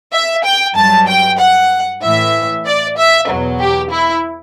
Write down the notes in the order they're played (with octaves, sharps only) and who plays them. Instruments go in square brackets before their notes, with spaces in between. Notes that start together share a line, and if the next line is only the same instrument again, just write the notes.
[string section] E5
G5
G2 F#3 A5
G5
F#5
A2 E3 E5
D5
E5
E2 B2 F#3
G4
E4